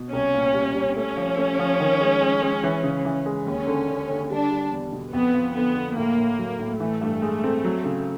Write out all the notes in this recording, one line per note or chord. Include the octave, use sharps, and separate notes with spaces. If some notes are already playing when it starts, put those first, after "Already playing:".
Already playing: B2
C2 C#4
A#2
G3
G3
A3 C#4
F3
A3
F3
D#3
G#3
G#3
G#3
E3
C#3
E3
G#3
D#2 C#4
D3
D3
D3
G3 D4
G3
E2
B2
F2 B3
F3
D3 B3
D3
A2 A#3
A2
F#3
A2
E3 A3
G2
G#3
C4
F#3
C#3